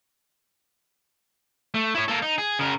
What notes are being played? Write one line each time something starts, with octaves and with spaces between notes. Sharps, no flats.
A3
E4 C#5
A#3 A4
D#4
G#4
C#3 A#4